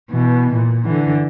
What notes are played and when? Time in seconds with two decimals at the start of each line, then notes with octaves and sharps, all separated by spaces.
0.11 B2 E3
0.54 A#2
0.85 D3 E3